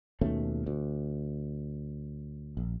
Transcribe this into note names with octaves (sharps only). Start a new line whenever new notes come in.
D#2 B2 A3 C#4
D2
A#1